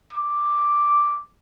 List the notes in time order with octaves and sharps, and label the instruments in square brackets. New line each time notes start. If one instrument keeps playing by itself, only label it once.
[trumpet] D6